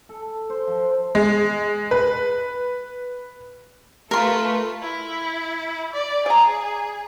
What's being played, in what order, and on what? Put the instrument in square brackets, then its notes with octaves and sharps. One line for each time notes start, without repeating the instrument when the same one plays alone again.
[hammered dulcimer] A4
C5
F3
[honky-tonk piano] G#3
B4
[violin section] A3 F4 B4 [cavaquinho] A#4 C6
[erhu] E4
D5
[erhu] G#4 [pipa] D5 A#5